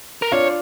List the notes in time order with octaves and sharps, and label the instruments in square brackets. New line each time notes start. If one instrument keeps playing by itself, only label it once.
[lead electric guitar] A#4
[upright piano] D4 F4 [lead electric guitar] C#5